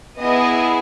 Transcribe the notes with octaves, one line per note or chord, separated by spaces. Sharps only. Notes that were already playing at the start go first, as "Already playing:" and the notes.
B3 E4 G#4 D#5